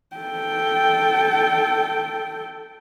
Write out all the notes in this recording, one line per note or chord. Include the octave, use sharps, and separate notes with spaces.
A4 G5